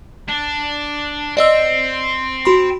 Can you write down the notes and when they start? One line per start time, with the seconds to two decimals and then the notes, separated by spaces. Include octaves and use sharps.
0.29 D4
1.37 C4 D5 D#5 E6
2.45 F#4 B5 C6